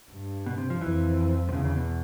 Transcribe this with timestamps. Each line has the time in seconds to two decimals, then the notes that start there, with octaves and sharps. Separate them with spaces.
0.11 G2
0.46 B2
0.58 C3
0.70 F3
0.81 F2 E3
1.49 C3
1.53 E2 C#3
1.65 C#3
1.76 B2